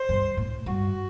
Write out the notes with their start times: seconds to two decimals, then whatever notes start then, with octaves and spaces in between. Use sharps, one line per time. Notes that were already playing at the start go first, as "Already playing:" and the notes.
Already playing: C5
0.09 G2
0.37 A2
0.66 G2 F#4